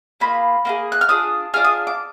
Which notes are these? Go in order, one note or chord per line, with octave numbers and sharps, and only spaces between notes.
A#3 F4 G#4 B5
A#3 F4 G#4
F#6
F6
D4 F4 G#4 D#6
D4 F4 G#4 F6
D#6
D6